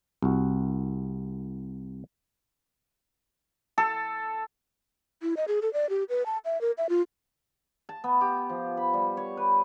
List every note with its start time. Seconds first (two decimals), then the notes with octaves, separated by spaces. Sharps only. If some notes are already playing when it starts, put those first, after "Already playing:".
0.23 C2 F#4
3.78 A4
5.22 E4
5.37 D#5
5.48 G#4
5.62 A4
5.73 D5
5.90 G4
6.09 B4
6.26 A5
6.45 E5
6.61 A#4
6.78 E5
6.89 F4
7.89 A5
8.04 B3
8.21 G4
8.49 F3
8.77 B5
8.93 G3
9.17 C#5
9.37 B4